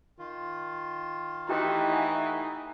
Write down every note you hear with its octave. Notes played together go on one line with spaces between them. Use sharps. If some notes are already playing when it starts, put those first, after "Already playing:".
D#3 F4
E3 A3 D#4 E4 G4 G5
E5 F#5 G#5